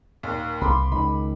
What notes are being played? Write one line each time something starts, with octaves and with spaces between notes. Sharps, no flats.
D#2 A#2
C2 B5 C6 D6
C#2 D#3 B5